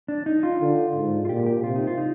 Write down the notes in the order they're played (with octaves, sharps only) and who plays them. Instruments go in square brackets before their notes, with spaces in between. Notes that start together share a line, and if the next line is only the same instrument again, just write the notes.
[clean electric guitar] D4
D#4
F4
[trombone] D3
G#2
[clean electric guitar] F4
[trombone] A#2 [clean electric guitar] G4
[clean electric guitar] G4
[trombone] C3 [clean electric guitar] F4
[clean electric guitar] D#4
F4
D#4